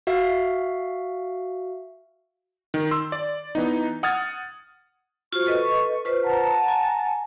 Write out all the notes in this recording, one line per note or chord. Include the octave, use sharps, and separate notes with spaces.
F#4 E5 F5
D#3
C6 E6
D5
E3 B3 D#4
F#5 D#6 F6 G#6 A6
F4 F#4 C5 C#6
A4 B4 D#5
F4 B4 C5
F#5 A5 A#5
G#5